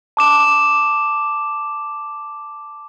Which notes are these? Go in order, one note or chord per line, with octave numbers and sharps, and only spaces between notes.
A5 D6 E7